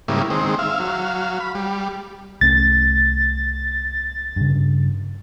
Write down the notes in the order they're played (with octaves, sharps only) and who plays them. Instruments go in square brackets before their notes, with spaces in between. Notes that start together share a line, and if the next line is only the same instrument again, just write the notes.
[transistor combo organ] G#2 C#3 G3 A#3 E4
D#3 G#3 C4
E5 F5
F#3 F5
B5
G3
[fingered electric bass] C2 A3 C#4 [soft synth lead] A6
[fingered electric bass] G2 C#3